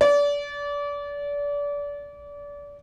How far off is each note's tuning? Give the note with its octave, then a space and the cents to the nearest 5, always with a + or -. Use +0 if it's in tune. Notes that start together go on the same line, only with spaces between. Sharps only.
D5 -30